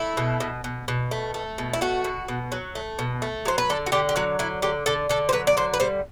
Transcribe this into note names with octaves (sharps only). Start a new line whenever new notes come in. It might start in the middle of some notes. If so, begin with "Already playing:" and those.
Already playing: A3 E4
B2
B2
B2
B2
A3
A3
B2
E4
A3 F#4
B2
B2
F#3
A3
B2
A3
F#3 C5
B4
D3 A4
F#4
D3 G4
G4
F#3 F#4
D3 E4
D3 G4
D3 A4
D3 A4
C5
F#3 B4
D5
D3 C5
B4
G3 C5